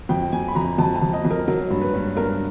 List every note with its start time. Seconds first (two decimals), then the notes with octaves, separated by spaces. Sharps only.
0.09 F2 G5
0.32 F2 G#5
0.48 B5
0.55 F2 A#5
0.78 F2 A5
0.95 A5
1.01 F2
1.13 D#5
1.25 F2
1.30 A#4
1.48 F#3 A#4
1.70 G2
1.81 B4
1.94 G2
2.16 G2 A#4